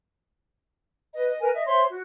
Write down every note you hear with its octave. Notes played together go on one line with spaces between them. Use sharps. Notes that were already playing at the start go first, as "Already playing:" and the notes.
B4 D#5
D#5
A#4 B4 G#5
D#5 E5
C5 C#5 E5 C6
F#4